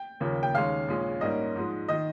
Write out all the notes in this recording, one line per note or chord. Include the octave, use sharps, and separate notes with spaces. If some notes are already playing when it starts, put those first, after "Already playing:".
Already playing: G5
D#2 C#3 F3 A#3 C#4
G5
D#2 D#3 G#3 C#4 F5
A#1 A#2 G#3 C#4
G#2 G3 A#3 C#4 D#5
G#2 F3 G#3
D#3 D#5